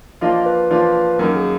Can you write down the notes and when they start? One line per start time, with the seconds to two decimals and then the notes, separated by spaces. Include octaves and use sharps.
0.21 F3 A#3 D4 F4 D#5
0.46 B4
0.70 F3 A#3 D4 F4
1.19 F#2 D#3 A#3 D#4 A#4
1.36 G#4